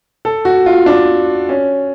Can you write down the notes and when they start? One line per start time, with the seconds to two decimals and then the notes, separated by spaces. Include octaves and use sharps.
0.25 A4
0.45 F#4
0.66 F4
0.86 D4
1.49 C#4